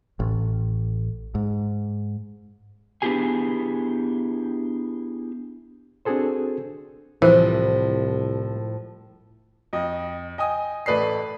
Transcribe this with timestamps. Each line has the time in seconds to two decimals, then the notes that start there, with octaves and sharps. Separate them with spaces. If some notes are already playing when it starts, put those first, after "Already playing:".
0.20 A1
1.35 G#2
3.02 B3 D4 E4 G4 G#4 G#5
6.05 C4 D4 F#4 G#4 A4 C5
7.22 C2 A2 E3 F3 A#4 C5
9.73 F2 D#5
10.38 D#5 G5 G#5 D#6
10.86 A1 A3 B4 D5 D#6 C7